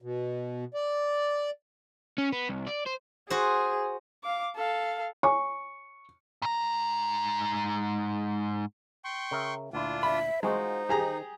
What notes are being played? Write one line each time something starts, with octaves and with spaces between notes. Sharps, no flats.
B2
D5
C#4
B3
C2
D5
C5
F#4 G#4 C5
F5 D6
A4 F5
C#5 G#5 C#6
G#2 A#5
G5 C6 C#6
C#3 A#4 E5
D2 A#2 D4 E4 F4
E5 B5
G#3 D#4 F4 F#4 G#4 C5
D#3 G4 G#4 A#5